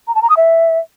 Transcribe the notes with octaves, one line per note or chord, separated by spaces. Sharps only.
A#5
A5
A#5
D#6
E5